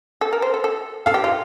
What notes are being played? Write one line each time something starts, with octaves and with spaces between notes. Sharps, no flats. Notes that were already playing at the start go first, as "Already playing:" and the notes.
A4
A#4
C5
A4
A4
A4 F5
G4
F4